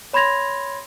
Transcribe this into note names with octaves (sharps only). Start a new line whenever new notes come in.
C#5 B5 C6 G#6 A#6 F7